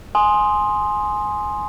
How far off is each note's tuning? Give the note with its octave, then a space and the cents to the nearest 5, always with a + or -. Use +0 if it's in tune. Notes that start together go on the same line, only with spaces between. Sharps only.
G#5 +10 C6 +5 D#6 +0